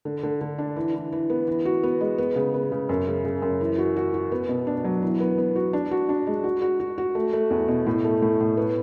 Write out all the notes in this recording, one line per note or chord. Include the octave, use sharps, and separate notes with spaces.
D3
D3
D3
D4
E3
E3
E3
B3
E3
F#4
B3
G#3
B3
C#3
B3
C#3
F#2
C#3
C#3
F#2
E3
F#4
F#4
F#4
B3
B2
D4
F#3
E3
B3
B3
F#4
D4
F#4
D4
G#3
F#4
F#4
F#4
F#4
A3
A3
E2
B2
A2
A3
A2
A2
B3